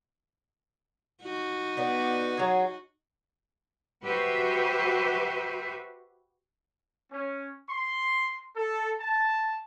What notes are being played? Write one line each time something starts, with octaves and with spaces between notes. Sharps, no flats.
D#4 F#4
B3 D5
F#3 G#4
F#4 G4 B4 C5 E5
C#4
C6
A4
A5